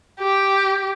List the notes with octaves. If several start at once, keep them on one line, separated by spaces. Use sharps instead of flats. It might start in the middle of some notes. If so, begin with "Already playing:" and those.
G4